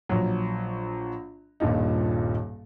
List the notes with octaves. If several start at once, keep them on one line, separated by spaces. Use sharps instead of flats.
A#1 F#3
D#1 G2 A#2 D#4